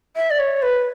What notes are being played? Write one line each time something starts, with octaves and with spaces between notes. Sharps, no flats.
E5
D5
C#5
B4